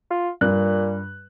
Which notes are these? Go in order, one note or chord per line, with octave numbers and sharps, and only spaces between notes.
F4
G2 A#2 F#6